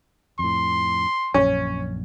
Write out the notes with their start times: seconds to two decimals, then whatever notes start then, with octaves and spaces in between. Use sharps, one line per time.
0.39 F2 A2 C6
1.34 A#1 F#2 C#4